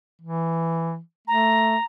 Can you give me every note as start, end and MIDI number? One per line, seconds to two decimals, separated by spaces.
0.22 0.99 52
1.28 1.76 57
1.28 1.85 82